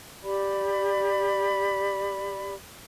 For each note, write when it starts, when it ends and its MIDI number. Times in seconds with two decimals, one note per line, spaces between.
0.23 2.55 67
0.23 2.55 74
0.23 2.55 83